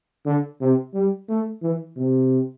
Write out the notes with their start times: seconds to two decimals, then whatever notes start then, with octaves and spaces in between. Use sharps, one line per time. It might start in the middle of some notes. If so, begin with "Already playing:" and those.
0.26 D3
0.61 C3
0.94 G3
1.29 A3
1.62 E3
1.97 C3